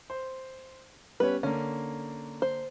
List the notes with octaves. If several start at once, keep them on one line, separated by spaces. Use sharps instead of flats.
C5
G3 B3 C#4 B4
D3 A#3 C#4
C5